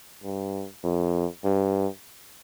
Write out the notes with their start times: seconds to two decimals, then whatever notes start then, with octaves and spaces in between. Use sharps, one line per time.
0.24 G2
0.83 F2
1.44 G2